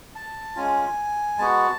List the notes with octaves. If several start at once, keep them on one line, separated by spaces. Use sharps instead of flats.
A5
G#3 C#4 F4 G#5
G#3 B3 F#4 A5